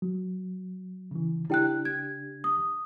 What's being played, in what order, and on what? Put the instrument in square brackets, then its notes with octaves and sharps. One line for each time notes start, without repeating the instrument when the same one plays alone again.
[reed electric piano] F#3
C#3 E3
[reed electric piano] C#3 D4 G4 [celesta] E4 G5 F#6
[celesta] G#6
D#6